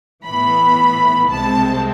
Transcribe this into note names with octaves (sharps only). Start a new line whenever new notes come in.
A2 E3 B3 B5
C2 C3 G#3 C4 A5